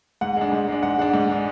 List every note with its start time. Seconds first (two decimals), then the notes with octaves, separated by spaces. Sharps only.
0.21 G#2 F#5
0.36 G#3 D4
0.52 G#2
0.68 G#3 D4
0.83 G#2 F#5
0.98 G#3 D4 F#5
1.13 G#2
1.29 G#3 D4